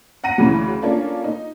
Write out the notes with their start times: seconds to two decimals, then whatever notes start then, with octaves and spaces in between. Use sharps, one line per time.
0.24 F#5 A#5 A#6 D#7
0.38 D2 C#3 E3 F#3
0.82 A#3 C#4 D4 F4 A4
1.24 D#4